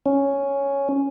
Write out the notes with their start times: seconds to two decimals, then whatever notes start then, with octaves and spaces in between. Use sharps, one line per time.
0.06 C#4